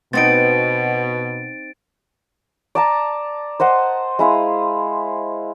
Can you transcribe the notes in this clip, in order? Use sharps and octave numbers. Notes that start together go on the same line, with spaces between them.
B2 B3 C4 D#4 F#4 B4 A6 D7
D5 A5 A#5
C5 D#5 F#5 C6
G#3 E4 F5 D#6